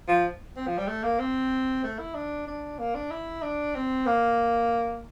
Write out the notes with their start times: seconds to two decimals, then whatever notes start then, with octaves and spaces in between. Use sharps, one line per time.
0.08 F3
0.56 C4
0.67 F3
0.78 G3
0.88 A3
1.04 A#3
1.19 C4
1.84 A3
1.99 E4
2.15 D4
2.47 D4
2.79 A#3
2.95 D4
3.11 E4
3.43 D4
3.75 C4
4.07 A#3